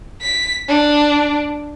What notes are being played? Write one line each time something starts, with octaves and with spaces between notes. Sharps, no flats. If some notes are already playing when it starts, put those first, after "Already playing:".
B6
D4